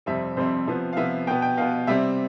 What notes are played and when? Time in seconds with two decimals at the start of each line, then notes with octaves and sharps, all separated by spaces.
0.06 F2 C3 G3 C4 E5
0.37 F2 C3 G3 C4 C5
0.67 C3 F3 B3
0.92 F5
0.97 C3 F3 B3 E5
1.27 B2 B3 G5
1.42 G5
1.57 B2 B3 F5
1.87 C3 G3 C4 E5